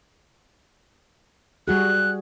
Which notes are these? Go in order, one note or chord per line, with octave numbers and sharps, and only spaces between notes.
G3 F#4 G#4 F#6